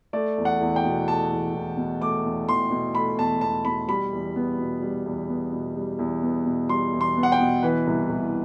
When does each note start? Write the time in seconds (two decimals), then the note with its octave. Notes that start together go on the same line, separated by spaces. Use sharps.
0.13 A3 D5
0.38 E2
0.45 F#5
0.61 E2
0.76 G5
0.84 B2
1.08 A3 A5
1.31 E2
1.55 E2
1.77 B2
2.01 A3 D6
2.24 E2
2.48 E2 C6
2.71 B2
2.95 A3 B5
3.18 E2 A5
3.41 E2 A5
3.65 B2 B5
3.88 G3 B5
4.12 E2
4.36 B3
4.58 B2
4.82 G3
5.05 E2
5.29 B3
5.53 B2
5.75 G3
5.99 E2
6.23 B3
6.45 B2
6.69 G3 C6
6.93 E2
7.01 C6
7.17 B3
7.23 F#5
7.32 G5
7.40 B2
7.63 E3 B4
7.87 C2
8.10 C2